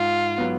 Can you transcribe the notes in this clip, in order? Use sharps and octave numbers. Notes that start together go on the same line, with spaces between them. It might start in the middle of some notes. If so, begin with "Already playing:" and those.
Already playing: G#2 F4
F#3 B3